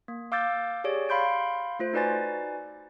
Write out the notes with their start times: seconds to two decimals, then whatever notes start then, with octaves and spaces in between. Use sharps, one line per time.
0.08 A#3
0.32 F5 D6 E6 G6 A6
0.84 G4 G#4 C#5 D5
1.09 F5 B5 C6 G6 D7
1.79 A3 F4 C5
1.93 D#4 F#4 B4 D5 G#5 A6